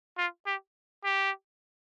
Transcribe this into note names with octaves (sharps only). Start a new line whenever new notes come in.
F4
G4
G4